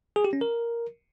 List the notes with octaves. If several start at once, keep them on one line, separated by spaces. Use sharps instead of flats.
G#4
G4
C#4
A#4